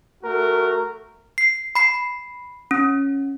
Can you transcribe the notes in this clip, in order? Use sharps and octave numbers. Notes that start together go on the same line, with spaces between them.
A3 F#4 A#4
C7
B5 C7
C#4